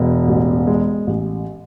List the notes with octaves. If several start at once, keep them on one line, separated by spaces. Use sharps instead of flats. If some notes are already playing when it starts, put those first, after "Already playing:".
Already playing: E1 B2
A1
G#3
A1